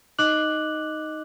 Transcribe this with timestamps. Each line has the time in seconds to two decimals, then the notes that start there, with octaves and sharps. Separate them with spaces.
0.19 D#4 D#5 D6 F#6 F#7